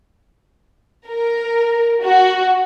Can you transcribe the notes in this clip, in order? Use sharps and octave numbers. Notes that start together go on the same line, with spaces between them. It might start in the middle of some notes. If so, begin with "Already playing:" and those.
A#4
F#4